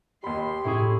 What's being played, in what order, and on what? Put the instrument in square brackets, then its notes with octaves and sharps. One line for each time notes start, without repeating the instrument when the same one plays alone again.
[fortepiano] D#2 B5 [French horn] G4 [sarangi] C6
[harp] A2 C#4 B6 [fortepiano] E4 G#4